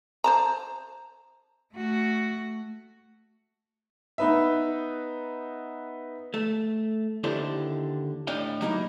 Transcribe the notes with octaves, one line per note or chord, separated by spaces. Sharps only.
C5 A5 A#5
A3 F#4
B3 D#4 B4 E5
A3
D#2 D3 E4 G4 A4 C5
A2 D4 D5 D#5 F5 G5
F#3 A#3 D#4 E4